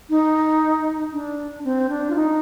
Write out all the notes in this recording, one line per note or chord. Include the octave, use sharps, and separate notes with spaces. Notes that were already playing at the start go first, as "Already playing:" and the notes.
D#4
D4
C4
D4
F4
D#4